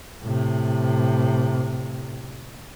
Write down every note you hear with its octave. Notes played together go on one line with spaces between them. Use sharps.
A2 C3